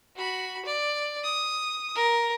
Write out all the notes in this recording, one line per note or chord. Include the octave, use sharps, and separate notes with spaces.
F#4 B5
D5
D#6
A#4